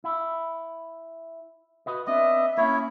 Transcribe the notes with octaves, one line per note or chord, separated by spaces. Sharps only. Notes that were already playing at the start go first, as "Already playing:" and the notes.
E4
F#4 B4 D#5
B3 C4 D4 D#5 E5
A#3 C#4 E4 C#5